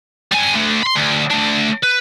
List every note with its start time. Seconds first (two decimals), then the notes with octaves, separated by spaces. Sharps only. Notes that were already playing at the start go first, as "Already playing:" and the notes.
0.32 G3 G#5
0.54 D3 A3
0.83 B5 C6
0.96 D2
1.31 A3 D4
1.83 B4